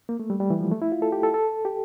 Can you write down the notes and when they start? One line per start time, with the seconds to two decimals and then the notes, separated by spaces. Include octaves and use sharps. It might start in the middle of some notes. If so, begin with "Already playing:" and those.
0.09 A#3
0.20 A3
0.30 G3
0.40 G3
0.50 E3
0.61 F3
0.71 A3
0.82 E4
0.92 F4
1.02 A4
1.12 G4
1.23 A4
1.34 A4
1.65 G4